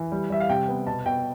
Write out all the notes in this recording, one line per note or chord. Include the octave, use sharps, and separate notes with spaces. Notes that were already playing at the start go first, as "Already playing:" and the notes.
Already playing: E3
G3
G3 E5
F5
C3 G5
B3
B2 A5
B2 G5